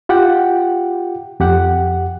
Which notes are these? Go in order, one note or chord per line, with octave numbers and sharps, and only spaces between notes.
F4 G4 F#5 G5
F2 G4 F#5